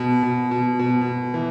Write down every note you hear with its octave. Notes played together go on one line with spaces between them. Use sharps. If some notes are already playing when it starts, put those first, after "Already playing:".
Already playing: B2
B2
B2
B2
B2
E3